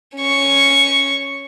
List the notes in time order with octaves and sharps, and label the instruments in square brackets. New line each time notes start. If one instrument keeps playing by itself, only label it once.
[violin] C#4 C#6